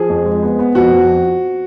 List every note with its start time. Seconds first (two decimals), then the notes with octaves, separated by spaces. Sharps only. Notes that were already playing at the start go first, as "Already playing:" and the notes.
Already playing: F3 G#4
0.09 F2
0.25 G#3
0.43 B3
0.59 B3
0.75 F2 F#4
0.93 F2